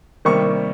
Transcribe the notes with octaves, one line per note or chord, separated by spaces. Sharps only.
C3 D#3 G3 A#3 C#6